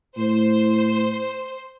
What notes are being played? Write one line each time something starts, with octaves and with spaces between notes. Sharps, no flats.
A2 C5